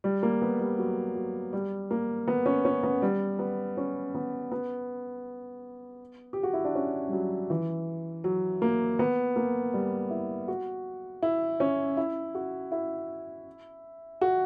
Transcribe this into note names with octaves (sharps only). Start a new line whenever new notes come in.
G3
A#3
B3
G3
F#3
F#3
G3
A#3
B3
C#4
C#4
B3
G3
B3
C#4
B3
B3
G4
F#4
E4
D4
C#4
G3
F#3
E3
F#3
A#3
B3
A#3
G3
E4
F#4
E4
C#4
E4
F#4
E4
F#4